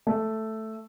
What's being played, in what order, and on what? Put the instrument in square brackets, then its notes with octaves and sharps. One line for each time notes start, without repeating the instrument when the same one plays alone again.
[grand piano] A3